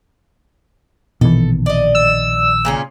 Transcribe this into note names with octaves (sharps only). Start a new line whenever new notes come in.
A#1 B2 D#3 E3 A4
D5 D#5
E6
A#2 C#3 C#4